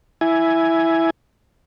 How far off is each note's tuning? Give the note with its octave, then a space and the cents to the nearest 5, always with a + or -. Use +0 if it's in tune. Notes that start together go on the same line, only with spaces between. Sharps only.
E4 +0 G#5 +5